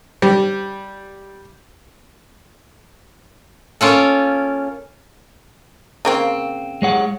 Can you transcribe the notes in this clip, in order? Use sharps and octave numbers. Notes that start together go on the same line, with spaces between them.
G3
A#3 C#4 F4 A4
C#3 A#3 C4
G#3 C#5 F#5